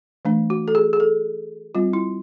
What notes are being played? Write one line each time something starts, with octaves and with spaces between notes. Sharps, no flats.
E3 A3 D4
F#4
A4
G#4
G#4
A4
G3 C4 F4
E4